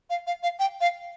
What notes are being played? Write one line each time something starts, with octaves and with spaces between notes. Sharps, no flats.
F5
F5
F5
G5
F5